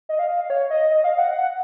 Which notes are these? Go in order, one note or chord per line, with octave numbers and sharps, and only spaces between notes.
D#5
F5
F5
C#5
D#5
D#5
F5
F#5
F#5